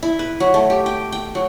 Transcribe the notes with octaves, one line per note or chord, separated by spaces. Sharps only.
E4
B4
F#3
A3
G4
G5
G5
F#3